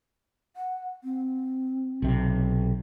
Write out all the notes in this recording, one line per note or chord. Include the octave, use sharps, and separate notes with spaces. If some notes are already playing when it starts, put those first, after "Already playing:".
F#5
C4
B1 C3